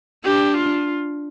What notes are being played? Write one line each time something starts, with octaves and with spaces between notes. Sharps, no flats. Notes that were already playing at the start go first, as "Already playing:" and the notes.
D4 G4
F4